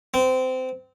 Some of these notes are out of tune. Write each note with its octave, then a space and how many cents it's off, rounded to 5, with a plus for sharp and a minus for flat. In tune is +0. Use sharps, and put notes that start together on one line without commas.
C4 -25